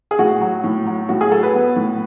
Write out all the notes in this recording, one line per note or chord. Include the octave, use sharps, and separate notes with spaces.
G#4
A2 F#4
F#3
A2
F#3
A2 F#4
G#4
F#3 A4
B4
B3
A2